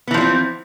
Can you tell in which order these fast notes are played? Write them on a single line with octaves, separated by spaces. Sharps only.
B3 E3 F3 G3 C4